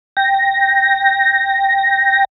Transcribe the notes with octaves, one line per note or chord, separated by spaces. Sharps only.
G5 A#6